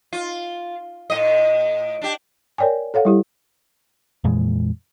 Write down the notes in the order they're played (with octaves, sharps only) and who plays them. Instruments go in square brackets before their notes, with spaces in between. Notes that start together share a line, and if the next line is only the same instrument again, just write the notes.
[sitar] F4
A2 D#5
D4 G4
[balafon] A#4 C#5 D5 G5 G#5
A4 C#5 F5 F#5
G3 E4 G4
[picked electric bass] F2 A#2 E3 G#3